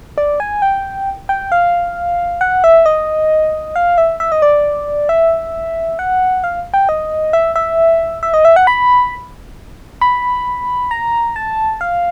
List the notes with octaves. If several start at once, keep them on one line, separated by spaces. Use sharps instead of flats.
D5
G#5
G5
G5
F5
F#5
E5
D#5
F5
E5
E5
D#5
D5
E5
F#5
F5
G5
D#5
E5
E5
E5
D#5
E5
F#5
B5
B5
A#5
A5
F5